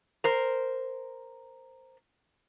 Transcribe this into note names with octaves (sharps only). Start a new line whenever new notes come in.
A#4 C5